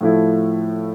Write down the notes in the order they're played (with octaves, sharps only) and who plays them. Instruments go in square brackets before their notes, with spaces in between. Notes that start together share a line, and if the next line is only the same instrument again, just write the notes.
[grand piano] A2 F3 A3 E4